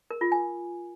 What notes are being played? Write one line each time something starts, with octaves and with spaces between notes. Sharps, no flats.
A#4
F4
G#5